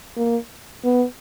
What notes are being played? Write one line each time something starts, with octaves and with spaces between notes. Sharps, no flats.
A#3
B3